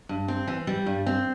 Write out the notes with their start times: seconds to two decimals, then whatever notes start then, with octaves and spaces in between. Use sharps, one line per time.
0.09 G2
0.28 C4
0.47 E3
0.67 G3
0.86 G2
1.06 C4